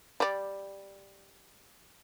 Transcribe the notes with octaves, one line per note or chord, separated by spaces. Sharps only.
G3 D5